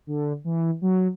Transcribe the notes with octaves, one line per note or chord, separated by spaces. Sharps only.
D3
E3
F#3